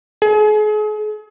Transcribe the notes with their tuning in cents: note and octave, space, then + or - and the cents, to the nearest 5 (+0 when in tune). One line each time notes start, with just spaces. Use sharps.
G#4 +40